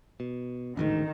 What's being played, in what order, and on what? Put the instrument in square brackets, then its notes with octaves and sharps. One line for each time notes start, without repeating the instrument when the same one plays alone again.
[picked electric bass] B2
[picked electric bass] A1 D2 G#2 [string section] D#3